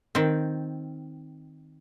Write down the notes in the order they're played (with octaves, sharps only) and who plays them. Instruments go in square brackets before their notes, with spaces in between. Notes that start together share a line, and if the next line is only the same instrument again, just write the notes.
[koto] D#3 C4